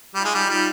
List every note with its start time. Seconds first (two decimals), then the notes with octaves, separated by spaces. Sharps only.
0.15 G3 D#4 F4
0.25 G#3
0.34 G3
0.49 G3